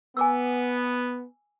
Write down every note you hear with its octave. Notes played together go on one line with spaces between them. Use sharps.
B3 G#5 D6 E6